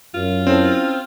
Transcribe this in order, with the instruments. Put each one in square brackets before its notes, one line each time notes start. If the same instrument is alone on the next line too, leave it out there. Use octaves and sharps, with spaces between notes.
[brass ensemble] F#2 [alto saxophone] F4
[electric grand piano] C4 [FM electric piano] C#4 E4 A4